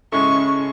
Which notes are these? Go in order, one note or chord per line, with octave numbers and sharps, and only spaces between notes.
C#3 G#3 C#4 E4 A4 C#6